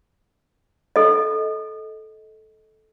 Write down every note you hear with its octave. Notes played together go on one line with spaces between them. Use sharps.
A4 D#5